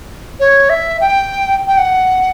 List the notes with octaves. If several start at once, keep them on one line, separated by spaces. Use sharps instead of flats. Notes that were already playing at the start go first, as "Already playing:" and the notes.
C#5
E5
G5
G5
F#5